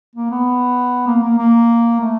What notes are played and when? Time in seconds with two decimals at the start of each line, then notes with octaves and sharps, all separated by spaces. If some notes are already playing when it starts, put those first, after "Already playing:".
0.15 A#3
0.31 B3
1.07 A#3
1.23 A#3
1.38 A#3
2.00 A3